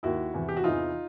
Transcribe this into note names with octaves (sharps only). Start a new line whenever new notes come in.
D#2 D#3 E4 F#4
E2 C3 E3
G4
F#4
E2 C3 E3 D#4 F4